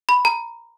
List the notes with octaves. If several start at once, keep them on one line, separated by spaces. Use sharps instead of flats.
B5
A#5